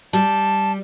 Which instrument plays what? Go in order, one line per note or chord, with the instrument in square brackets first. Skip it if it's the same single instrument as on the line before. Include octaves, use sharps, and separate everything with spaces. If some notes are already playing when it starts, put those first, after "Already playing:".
[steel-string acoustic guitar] G3 [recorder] A5